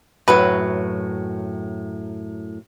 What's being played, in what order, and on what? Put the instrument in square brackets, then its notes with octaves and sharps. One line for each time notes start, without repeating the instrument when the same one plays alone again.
[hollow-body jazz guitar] F#2 A2 F#3 [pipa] B4